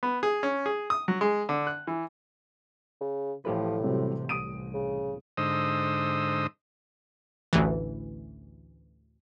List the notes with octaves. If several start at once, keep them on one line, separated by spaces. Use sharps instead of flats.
B3
G#4
C#4
G#4
D#6
F#3
G#3
D3
F#6
E3
C#3
A1 A2 F3 G4 B4
C3 F#3 G3 C4
C2 D#6 D7 D#7
C#3
G#2 D3 C5 D#5 D#6 E6
A1 D2 E3